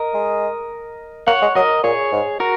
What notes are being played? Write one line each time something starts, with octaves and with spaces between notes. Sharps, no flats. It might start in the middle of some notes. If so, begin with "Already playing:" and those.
Already playing: A#4 D#5
G#3
A#3 C#5 F#5
G#3
F#3 A#4 D#5
A#2 G#4 C#5
G#2
F#4 A#4